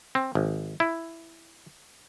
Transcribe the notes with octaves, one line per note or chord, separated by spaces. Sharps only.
C4
G#1
E4